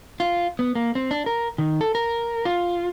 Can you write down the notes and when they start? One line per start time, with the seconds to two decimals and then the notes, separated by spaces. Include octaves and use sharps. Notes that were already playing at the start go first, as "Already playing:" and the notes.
0.20 F4
0.59 B3
0.75 A#3
0.95 C4
1.11 D4
1.26 A#4
1.58 D#3
1.81 A4
1.95 A#4
2.45 F4